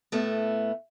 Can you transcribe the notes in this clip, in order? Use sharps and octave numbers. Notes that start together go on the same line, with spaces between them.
A2 A3 B3